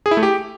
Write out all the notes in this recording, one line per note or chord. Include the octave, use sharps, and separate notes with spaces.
G#4
E4
A3
G4